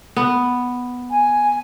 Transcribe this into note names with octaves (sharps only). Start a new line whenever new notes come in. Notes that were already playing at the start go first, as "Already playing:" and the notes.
B3
G#5